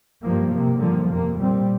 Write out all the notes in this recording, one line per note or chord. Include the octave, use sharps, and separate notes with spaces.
G2 F3 A#3
C3 A#3
G2 D3 F3 A#3
F2 C3 A#3
A#2 G3 C4